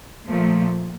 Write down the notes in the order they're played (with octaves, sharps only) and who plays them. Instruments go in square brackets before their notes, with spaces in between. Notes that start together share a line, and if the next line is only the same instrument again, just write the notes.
[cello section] A#2 F3 A3